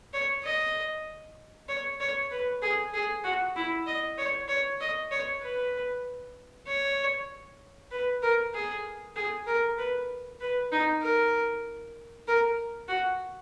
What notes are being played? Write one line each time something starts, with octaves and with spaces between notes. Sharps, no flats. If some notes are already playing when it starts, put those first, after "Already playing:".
C#5
D#5
C#5
C#5
B4
G#4
G#4
F#4
E4
D#5
C#5
C#5
D#5
C#5
B4
C#5
B4
A#4
G#4
G#4
A#4
B4
B4
D#4
A#4
A#4
F#4